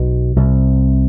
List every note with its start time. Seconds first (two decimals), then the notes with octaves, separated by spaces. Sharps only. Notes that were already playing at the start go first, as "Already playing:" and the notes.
Already playing: B1 B2
0.36 C2 C3